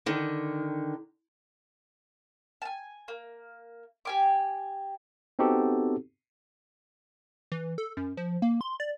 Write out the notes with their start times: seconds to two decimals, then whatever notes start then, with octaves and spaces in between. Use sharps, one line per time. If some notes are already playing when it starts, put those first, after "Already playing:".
0.06 D3 D#3
2.62 G#5 A5
3.08 A#3
4.05 G4 G#5 D6
5.39 B3 C4 D#4 F#4 G4 A4
7.52 E3
7.78 A4
7.97 F#2
8.17 F3
8.42 A#3
8.61 C6
8.80 D5